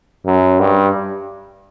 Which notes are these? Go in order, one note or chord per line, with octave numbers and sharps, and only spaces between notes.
F#2
G2